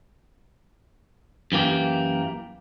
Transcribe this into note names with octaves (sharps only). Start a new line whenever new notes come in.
F#2 E3 A#3 G4